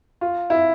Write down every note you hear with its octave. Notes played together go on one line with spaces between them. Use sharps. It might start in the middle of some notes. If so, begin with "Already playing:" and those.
F4
E4